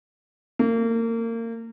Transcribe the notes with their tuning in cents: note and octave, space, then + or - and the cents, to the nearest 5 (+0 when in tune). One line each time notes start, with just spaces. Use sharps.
A#3 -30